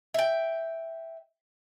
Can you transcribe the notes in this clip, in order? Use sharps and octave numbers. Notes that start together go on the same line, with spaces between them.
E5 G5